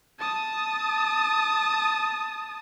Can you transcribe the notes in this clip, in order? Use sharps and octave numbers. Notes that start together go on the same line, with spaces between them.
A5 D#6